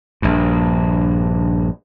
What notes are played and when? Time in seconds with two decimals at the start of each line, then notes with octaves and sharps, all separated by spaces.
0.22 A#1 G2